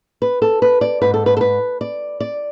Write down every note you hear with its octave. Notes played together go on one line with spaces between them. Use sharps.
B4
A4
B4
D5
G#2 B4
A4
B4
A4
B4
D5
D5